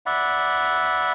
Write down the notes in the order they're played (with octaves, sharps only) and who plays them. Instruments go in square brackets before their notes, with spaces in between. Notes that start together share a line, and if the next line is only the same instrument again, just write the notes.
[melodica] D5 E5 F#5 B5